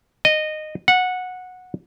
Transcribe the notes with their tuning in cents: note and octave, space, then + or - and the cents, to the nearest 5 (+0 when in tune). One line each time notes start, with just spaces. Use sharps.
D#5 -15
F#5 -15